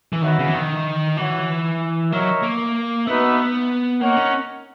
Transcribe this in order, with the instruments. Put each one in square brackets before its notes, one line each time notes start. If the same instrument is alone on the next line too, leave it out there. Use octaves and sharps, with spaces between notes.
[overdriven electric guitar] E3
[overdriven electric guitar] D#3 [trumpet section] B3 F#4 C#5 E5
[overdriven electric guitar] C#3
E3
D#3
[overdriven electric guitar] E3 [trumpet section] F#4 C#5 F#5
[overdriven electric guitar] F#3 [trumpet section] D#4 A#4 C#5 E5
[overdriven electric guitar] A#3
[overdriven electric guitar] B3 [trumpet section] D#4 F#4 B4 E5
[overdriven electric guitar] A#3 [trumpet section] D#4 A#4 C#5 F#5
[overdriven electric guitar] C#4